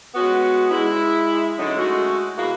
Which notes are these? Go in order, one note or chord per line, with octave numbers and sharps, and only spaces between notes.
G#3 B3 C#4 F#4
G#3 E4
D3 F#3 G#3 C#4 D#4
G#3 A3 F#4
B2 G#3 A#3 E4 F#4